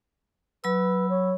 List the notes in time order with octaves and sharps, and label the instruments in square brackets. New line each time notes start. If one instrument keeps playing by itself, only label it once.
[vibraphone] F#3 B5 E6 [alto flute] B4
[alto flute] C#5